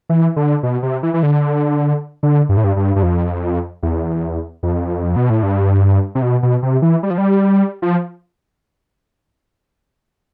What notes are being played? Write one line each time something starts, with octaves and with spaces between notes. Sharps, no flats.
E3
D3
B2
C3
E3
E3
D3
D3
G2
A2
G2
G2
G2
F2
E2
F2
B2
A2
G2
C3
B2
B2
C3
E3
G3
F3
G3
F3